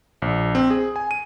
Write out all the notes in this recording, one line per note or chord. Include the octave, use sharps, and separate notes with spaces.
A#1
C4
G#4
G#5
D#7